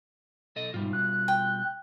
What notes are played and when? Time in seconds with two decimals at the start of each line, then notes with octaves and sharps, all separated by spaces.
0.56 B1 A4 D#5
0.74 G#2 B2 G3 F4
0.93 F#6
1.28 G5